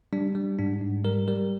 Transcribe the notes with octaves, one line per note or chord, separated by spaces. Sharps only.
G3 D4
G3
G#2 D4
G#2
G3 A#4
G3 A#4